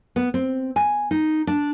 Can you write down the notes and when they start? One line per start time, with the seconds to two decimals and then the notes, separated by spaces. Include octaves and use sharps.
0.16 B3
0.34 C4
0.76 G#5
1.11 D#4
1.47 D4